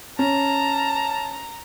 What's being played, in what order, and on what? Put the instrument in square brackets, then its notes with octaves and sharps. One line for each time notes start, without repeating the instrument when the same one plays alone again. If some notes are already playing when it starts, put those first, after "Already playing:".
[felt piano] C#4 [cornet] A5 [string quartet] A#5